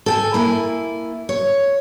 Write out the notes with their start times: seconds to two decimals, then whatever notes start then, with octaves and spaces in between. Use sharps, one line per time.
0.06 A4 G5 G#5
0.34 A#3 E4 G#5
1.29 C#5